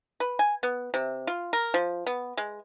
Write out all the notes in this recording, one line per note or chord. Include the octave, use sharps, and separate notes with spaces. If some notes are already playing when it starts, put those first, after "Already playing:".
B4
G#5
B3
C3
F4
A#4
F3
B3
G#3